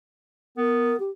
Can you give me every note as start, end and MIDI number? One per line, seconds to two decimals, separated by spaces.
0.57 0.94 59
0.57 0.99 70
1.00 1.10 67